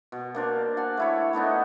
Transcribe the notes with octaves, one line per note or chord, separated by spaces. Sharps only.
B2
A#3 D4 C5
F#5 G#5 A5
A3 E4 C#5
A3 B3 D4 D#4